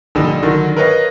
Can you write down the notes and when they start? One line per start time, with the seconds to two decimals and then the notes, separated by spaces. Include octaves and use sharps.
0.15 A#1 D3 G3 D#4
0.43 D3 D#3 F#3
0.76 A#4 B4 C#5 D#5 F5